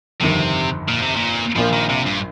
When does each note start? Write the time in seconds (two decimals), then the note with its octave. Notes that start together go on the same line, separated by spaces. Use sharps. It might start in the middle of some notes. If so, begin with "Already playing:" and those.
0.21 G1 F2 C3 D#3 C4
0.88 A#2
1.02 C3
1.16 A#2
1.55 A#1 A#2 F3 A#3
1.72 D#3
1.89 C3
2.06 G2